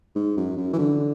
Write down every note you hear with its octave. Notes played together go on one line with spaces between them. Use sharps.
G#2
F#2
F#2
E3
D3